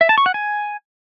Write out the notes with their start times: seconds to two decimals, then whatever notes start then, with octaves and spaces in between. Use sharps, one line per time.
0.01 E5
0.09 A5
0.18 C#6
0.26 F#5
0.34 G#5